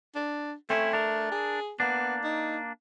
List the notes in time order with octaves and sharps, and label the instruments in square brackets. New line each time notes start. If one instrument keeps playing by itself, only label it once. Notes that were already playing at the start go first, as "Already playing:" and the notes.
[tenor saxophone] D4
[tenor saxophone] A3 [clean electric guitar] C4 C#4 E4
[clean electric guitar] D4 A#4
[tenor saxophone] G#4
[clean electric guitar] A#3 D4 [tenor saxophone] B3
[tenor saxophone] D#4